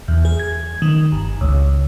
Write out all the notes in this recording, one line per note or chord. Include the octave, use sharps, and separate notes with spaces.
E2
G#4
G#6
D#3
G1
C#2